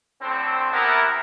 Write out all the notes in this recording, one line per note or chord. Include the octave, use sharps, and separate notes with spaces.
A2 D3 C4
C3 E3 B3 E4 A#4